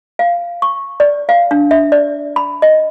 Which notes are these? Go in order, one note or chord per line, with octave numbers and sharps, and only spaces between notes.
F5
C#6
D5
F5
D4
E5
D5
B5
D#5